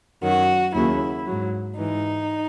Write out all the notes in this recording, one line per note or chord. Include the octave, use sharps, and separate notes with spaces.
F#2 D#3 F#3 F#4
D#2 C#3 F#3 E4
G#2 F#3
G#2 E3 D#4